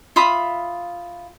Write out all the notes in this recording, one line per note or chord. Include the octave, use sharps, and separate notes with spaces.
F4 E5 B5 D#6